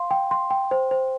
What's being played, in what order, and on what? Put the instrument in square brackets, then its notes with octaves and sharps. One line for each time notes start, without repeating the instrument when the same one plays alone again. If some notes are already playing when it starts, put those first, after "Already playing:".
Already playing: [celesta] F5 C6
G5
C6
G5
C5
C5